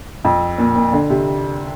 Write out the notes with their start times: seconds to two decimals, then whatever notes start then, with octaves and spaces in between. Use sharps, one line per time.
0.25 F2
0.58 A#2
0.76 A#2
0.93 D3
1.10 C3